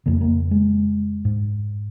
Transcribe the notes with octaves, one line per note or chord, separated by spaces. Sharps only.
F2 C#3 A#3
A#3
G#3
G#2